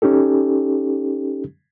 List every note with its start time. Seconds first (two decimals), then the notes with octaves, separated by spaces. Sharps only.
0.02 C#4 D#4 G4 A4